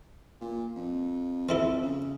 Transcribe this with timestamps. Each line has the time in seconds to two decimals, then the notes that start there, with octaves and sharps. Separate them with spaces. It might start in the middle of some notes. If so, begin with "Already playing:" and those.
0.41 A#2
0.76 F2
1.49 C4 E4 A4
1.82 C#3